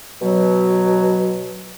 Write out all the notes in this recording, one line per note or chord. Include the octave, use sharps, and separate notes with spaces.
B2 F#3